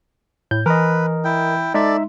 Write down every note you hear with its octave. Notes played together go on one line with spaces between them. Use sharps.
A2 G6
E3 A#4 B4 D#5
E4 G5
G#3 D#4 A4 D5 E5